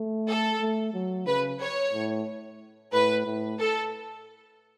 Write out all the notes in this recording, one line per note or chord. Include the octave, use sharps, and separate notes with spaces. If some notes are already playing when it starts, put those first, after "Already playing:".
Already playing: A3
A4
A3
F#3
C#3 B4
C#5
A2
A2 B4
A2
A4